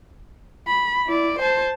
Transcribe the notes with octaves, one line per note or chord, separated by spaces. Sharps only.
B5
E4 D5
C5 A5